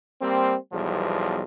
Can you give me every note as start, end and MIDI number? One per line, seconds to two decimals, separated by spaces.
0.21 0.56 55
0.21 0.56 58
0.21 0.56 60
0.72 1.42 35
0.72 1.42 40
0.72 1.42 53
0.72 1.42 55